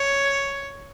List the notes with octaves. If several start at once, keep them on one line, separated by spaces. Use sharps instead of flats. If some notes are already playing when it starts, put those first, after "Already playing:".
Already playing: C#5